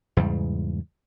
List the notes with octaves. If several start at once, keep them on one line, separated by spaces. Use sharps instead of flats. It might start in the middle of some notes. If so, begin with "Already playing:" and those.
E2 G#2 C#3 G3